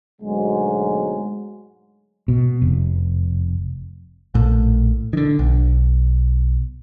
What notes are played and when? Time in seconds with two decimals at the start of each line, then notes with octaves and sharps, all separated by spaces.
0.22 D2 G#2 B2 F#3 G#3
2.28 B2
2.62 F1
4.34 A#1 A2
5.13 D3 D#3
5.39 B1